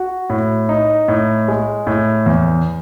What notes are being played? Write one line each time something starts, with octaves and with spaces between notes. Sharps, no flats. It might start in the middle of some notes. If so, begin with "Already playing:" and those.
Already playing: F#4
A2
D#4
A2
G#3
A2
E2